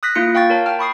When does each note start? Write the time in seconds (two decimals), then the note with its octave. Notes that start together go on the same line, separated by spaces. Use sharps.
0.03 D#6 F#6 A#6 B6
0.15 A#3 E4 F4 C#7
0.35 F5 G5 C#6 A6
0.50 A#4 C#5 A5
0.66 G5 A5 F6
0.79 B5 C#6 D#6 C7